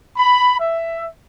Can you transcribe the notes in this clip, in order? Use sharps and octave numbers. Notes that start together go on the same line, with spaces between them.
B5
E5